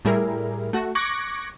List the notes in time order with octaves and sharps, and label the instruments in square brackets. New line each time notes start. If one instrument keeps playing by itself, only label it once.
[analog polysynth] A2 G3 E4 G#4 A#4
A3 F#4
C#6 D6 F#6 G#6 A#6